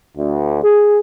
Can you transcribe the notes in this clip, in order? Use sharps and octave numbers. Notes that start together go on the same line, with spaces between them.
D2
G#4